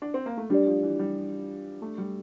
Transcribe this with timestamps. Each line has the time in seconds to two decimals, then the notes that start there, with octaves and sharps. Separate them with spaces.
0.02 D4
0.14 C4
0.26 A#3
0.38 A3
0.50 G3 D4 G4 D5
0.67 F3
0.83 E3
0.99 G3
1.82 A3
1.98 G3